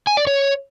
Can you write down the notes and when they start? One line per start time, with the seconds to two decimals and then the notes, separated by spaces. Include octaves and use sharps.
0.07 G#5
0.17 D5
0.27 C#5